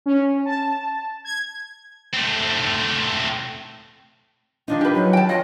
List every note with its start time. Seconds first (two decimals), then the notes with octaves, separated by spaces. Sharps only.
0.06 C#4
0.45 A5
1.25 G#6
2.14 A3 C4
4.68 D#3 F3 D4 D#4
4.81 G4 B4
4.94 F#3
5.13 G5 A5
5.29 F#3 F4 D#5